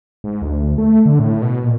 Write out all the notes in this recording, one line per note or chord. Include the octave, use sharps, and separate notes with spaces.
G#2
D2
A3
D3
A2
B2
A#2